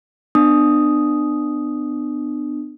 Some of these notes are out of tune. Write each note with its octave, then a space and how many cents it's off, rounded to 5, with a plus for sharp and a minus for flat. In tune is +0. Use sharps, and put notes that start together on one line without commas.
B3 +25 D4 +30 D#6 +0